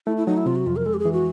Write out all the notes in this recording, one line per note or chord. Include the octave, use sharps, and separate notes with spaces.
A3 E4
E4
F#3 D#4
E4
C3 F4
F#4
F2 F4
A#4
G#3 A4
G4
G#4
E3
F#4